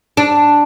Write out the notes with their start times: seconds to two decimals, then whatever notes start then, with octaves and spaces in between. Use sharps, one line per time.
0.17 D4